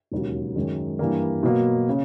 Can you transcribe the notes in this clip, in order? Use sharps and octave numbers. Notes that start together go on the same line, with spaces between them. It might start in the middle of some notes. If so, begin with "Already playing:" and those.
E1 D#2 C#3 F#3
F#2 D#3 G#3
G2 E3 G3 A#3
B2 F#3 A#3
C#3